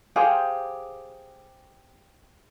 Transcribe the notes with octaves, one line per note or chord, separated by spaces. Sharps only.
G4 G#4 C5 F5